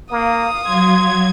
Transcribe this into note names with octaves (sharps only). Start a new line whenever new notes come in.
A#3 F5 D#6
F#3 C6 G#6